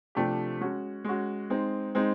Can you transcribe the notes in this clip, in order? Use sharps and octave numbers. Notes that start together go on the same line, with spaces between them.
C3 F3 A3 D4 G4
G#3 C#4 F#4
G#3 C#4 F#4
G#3 C4 D#4
G#3 C4 D#4